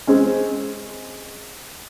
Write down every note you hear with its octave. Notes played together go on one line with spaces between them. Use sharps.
G#3 C4 C#4